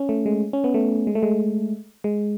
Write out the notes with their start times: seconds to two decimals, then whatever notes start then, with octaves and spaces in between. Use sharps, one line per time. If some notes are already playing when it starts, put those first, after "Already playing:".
Already playing: C#4
0.09 A3
0.26 G#3
0.53 C#4
0.64 B3
0.74 A3
1.07 G#3
1.15 A3
1.23 G#3
2.04 G#3